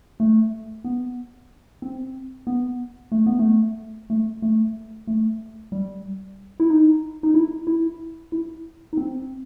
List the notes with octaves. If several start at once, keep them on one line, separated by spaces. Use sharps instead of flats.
A3
B3
C4
B3
A3
B3
A3
A3
A3
A3
G3
E4
D#4
D#4
E4
E4
E4
D#4
C4